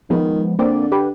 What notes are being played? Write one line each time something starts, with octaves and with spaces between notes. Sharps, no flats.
D#3 F3 G#3 B3
D3 A#3 C4 D5
G4 B4